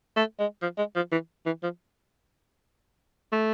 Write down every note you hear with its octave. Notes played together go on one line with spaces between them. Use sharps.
A3
G#3
F3
G#3
F3
E3
E3
F3
A3